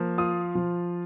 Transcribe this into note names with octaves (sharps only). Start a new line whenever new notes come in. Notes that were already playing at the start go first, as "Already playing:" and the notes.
Already playing: F3 A#3
F4 D#6
F3